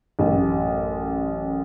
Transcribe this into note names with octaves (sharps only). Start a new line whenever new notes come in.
A1 F#2